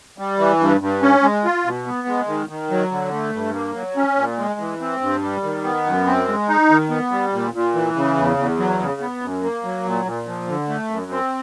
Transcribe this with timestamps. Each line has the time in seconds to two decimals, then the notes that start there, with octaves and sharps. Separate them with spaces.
0.18 G3
0.38 E3
0.60 G2
0.81 G2
1.02 C#4
1.22 G#3
1.45 F4
1.65 B2
1.86 B3
2.08 G#3
2.28 D#3
2.49 D#3
2.70 F#3
2.91 D3
3.12 A3
3.33 G2
3.54 A#3
3.75 F#3
3.96 C#4
4.17 A#2
4.39 G#3
4.60 E3
4.81 C4
5.01 G2
5.23 G3
5.43 D#3
5.64 B3
5.86 F#2
6.06 C4
6.28 G#3
6.49 D#4
6.70 D#3
6.90 B3
7.12 G3
7.33 A#2
7.54 A#2
7.75 E3
7.96 C#3
8.17 E2
8.37 E2
8.58 F#3
8.80 C#3
9.01 B3
9.22 F#2
9.43 A#3
9.64 F#3
9.85 A#2
10.05 A#2
10.27 F3
10.48 D3
10.69 A3
10.90 F#2
11.11 C4